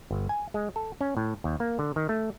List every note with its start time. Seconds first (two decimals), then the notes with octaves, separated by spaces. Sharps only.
0.11 G1
0.29 G#5
0.54 G#3
0.76 A4
1.01 C#4
1.17 A2
1.44 D#2
1.60 A#3
1.79 D3
1.96 D#3
2.09 A3